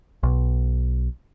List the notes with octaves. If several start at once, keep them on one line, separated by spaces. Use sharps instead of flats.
B1